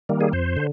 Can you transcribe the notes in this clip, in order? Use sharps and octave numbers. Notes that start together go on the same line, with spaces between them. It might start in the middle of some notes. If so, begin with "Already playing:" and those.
D#3 G3 A#3
G#4
F2 C5
D3